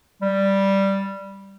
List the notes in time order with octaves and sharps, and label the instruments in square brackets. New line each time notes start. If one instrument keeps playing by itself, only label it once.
[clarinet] G3